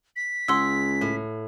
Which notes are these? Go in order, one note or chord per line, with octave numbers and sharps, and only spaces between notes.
B6
C#2 G#4 F#5 C6 E6
A2